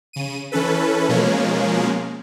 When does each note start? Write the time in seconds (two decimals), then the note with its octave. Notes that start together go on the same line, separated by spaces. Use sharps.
0.13 C#3 D#7
0.52 E3 C#4 A4 B4
1.09 B2 F3 G#3 A#3 C#4